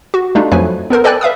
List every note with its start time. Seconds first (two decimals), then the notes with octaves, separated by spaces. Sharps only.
0.14 F#4
0.35 G3 A3 D4 D#4 F4
0.52 F2 F3 F#3 A3 B4 G#5
0.90 B3 A4 A#4 C5
1.04 A4 B4 D5 G5 G#5 F#6
1.21 B4 E5 F5 D#6